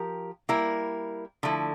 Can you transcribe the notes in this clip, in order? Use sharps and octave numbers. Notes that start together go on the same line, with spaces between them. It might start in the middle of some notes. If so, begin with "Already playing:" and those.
Already playing: F3 G4 A#4
G3 A#3 E4 A#4
D3 F3 A3 E4 A4